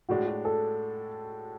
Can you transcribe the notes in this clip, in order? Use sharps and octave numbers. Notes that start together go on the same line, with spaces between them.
A2 G#3 D4 F#4
F#4
A4